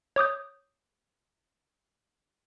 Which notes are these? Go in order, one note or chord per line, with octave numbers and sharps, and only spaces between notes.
C#5 D6 D#6 G6